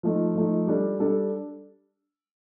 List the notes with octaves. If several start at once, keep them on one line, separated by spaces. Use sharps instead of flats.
F3 A3 D#4
F3 A3 D#4
G3 D4 A4
G3 D4 A4